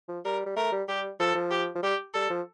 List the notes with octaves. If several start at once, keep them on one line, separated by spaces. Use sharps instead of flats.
F3
G3 A#4
G3
A3 A#4
G3
G3 G4
F3 A4
F3
G4
F3
G3 G4
G3 A4
F3